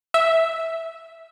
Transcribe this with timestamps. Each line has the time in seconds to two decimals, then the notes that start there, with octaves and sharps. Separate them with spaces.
0.14 E5